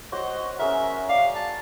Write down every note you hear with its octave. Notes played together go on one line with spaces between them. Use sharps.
F#4 C5 C#5 D#5
C#4 G#4 A#4 E5
D5 F5
A5